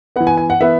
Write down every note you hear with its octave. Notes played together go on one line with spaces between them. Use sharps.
E3 B3 F#5
G#5
G#5
F#5
E3 B3 E5